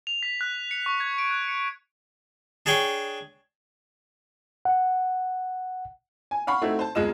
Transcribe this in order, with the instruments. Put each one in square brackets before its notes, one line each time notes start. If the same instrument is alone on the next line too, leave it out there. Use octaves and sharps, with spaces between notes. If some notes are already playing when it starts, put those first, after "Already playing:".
[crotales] F7
B6
F#6
C#7
C#6
G#6
D7
F#6
C#7
[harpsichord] D4 G#4 C#5 G5 C#6
[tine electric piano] F#5
[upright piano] G#5
F5 F#5 B5 C#6
A3 C4 D#4 E4 F#4
C5 A5
E1 C2 G#3 F4 D#5 E7